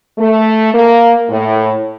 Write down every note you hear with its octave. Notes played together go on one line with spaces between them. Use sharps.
A3
A#3
A2